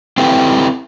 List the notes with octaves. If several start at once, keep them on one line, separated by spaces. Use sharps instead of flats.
C4 E4 G4 A4 B4